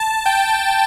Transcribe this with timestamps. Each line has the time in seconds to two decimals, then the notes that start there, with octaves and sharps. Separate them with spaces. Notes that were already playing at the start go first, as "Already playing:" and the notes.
Already playing: A5
0.26 G5